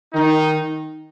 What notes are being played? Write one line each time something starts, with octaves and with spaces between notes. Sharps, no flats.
D#3 D#4